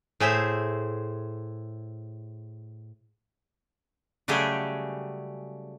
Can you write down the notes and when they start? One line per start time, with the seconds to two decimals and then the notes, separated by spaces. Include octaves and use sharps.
0.20 A2 G#4 C5 E5
4.28 C#3 F#3 G3 A3 G4 G#4